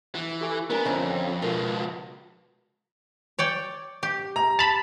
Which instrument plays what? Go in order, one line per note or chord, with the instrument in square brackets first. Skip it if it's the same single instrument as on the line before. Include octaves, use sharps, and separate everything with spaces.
[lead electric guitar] E3
[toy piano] G4 A4 G#5
[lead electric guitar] B3 [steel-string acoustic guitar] D4 A#4 [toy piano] C5 G#5 A#5
[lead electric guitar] F2 [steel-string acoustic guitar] D3 C4 C#4 [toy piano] D5 E5
[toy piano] G5
[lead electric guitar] C#2 F3 [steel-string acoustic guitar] B2 [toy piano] A#4
[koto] C#5 D5 G5
G4
[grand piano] A#5
[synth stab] A5 B5 [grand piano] F7